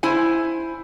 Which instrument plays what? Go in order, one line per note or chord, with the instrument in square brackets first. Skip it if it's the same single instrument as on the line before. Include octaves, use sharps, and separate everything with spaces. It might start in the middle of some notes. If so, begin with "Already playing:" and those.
[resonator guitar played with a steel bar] E4 C5 G#5